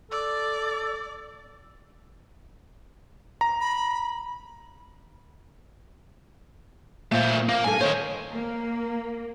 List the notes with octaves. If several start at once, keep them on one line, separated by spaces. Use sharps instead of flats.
A4 D5
A#5
B5
A#2 A3 C5
A#3
G2 A4 G#5
D#3 C5 C#5
A#3